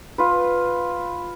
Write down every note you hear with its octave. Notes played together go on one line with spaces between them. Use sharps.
F4 B4